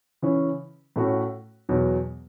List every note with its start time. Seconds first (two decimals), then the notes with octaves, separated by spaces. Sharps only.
0.22 C#3 E3 C#4
0.96 A2 A3 C#4 F#4
1.69 E2 B2 F#3